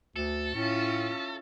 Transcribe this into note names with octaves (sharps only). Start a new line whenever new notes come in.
D2 A4
A2 C#4 E4 F4